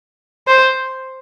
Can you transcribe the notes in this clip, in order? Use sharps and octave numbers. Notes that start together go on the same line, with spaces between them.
C5